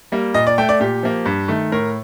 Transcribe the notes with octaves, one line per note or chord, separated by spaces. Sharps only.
G3 A#3
A#2 D#5
D5
A3 G5
D5
A#2 G4
F3 A#3
G2
D#3 A3
A2 A#4